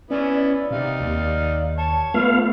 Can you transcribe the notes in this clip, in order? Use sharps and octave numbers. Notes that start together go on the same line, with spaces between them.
B3 C#4 E4 D5
D5
C3 D#4 F5
D#2
C#5 A5
A3 B3 F4 F5